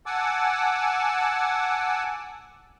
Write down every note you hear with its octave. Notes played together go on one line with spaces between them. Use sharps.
F#5 G#5 A5 D6 E6